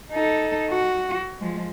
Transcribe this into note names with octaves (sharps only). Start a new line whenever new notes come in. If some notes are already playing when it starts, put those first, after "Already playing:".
D#4 A4
F#4
F3 G#3